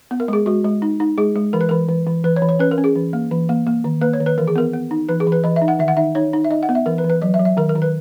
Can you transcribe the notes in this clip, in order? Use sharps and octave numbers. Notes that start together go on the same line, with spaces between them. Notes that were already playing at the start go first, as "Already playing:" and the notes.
B3
A#4
G#3 G#4
G#3 F#4
G#3
D#4
D#4
G#3 G#4
G#3
E3 A#4
B4
E3 A#4
E3
E3
E3 B4
C#5
E3
C#5
C#4 B4
A#4
C#4
G#4
E3
A#3
E3
A#3
A#3
D#3
A#3 B4
C#5
D#3
B4
E3 A#4
G#4
B3 A#4
B3
D#4
E3 B4
G#4
E3
B4
E3 D#5
E5
D#4
F#5
D#3 E5
F#5
D#4 E5
D#4 C#5
D#4
E5
D#4 D#5
F#5
B3
E5
E3 A#4
B4
E3
B4
F#3 D#5
E5
F#3
E5
D#3 A#4
A#4
D#3
B4